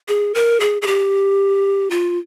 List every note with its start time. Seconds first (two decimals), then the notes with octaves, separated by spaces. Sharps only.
0.08 G#4
0.34 A#4
0.60 G#4
0.82 G#4
0.87 G4
1.91 F4